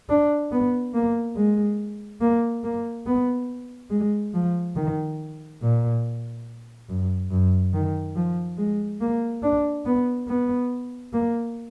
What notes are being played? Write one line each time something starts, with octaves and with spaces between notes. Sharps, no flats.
D4
B3
A#3
G#3
A#3
A#3
B3
G#3
F3
D#3
A#2
F#2
F#2
D#3
F3
G#3
A#3
D4
B3
B3
A#3